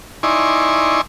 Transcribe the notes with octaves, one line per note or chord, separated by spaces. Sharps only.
D#4 E4 D5 G#5 C6 C#6